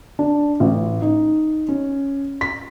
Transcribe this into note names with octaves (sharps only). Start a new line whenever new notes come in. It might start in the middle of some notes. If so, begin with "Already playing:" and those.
D4
A1
D#4
C#4
B6